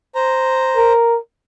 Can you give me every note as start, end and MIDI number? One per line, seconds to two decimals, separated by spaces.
0.15 0.93 72
0.15 0.93 82
0.77 1.19 70